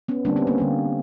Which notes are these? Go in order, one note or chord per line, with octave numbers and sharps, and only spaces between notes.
B3 C#4
D3 G3 A#3 C4 D4
B3 C#4
A#3 C4
D3 G3 A#3